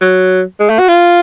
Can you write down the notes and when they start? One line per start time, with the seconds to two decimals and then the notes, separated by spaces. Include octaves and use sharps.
0.01 F#3
0.60 G#3
0.69 A3
0.79 F#4
0.88 F4